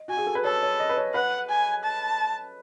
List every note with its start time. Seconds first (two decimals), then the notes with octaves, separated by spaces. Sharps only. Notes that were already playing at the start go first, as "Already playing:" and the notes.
Already playing: D#5
0.08 F#4 G#5
0.17 G#4
0.27 A4
0.35 B4
0.44 A4 C#5
0.63 C#5
0.80 D#5
0.89 B4
0.97 C#5
1.14 B4 F#5
1.49 G#5
1.84 A5